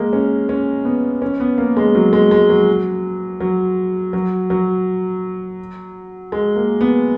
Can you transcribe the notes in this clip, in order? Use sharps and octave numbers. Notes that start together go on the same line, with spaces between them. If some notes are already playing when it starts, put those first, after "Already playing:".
Already playing: G#3 A#3
C#4
C#4
B3
C#4
B3
A#3
G#3
F#3
G#3
G#3
F#3
F#3
F#3
F#3
G#3
A#3
B3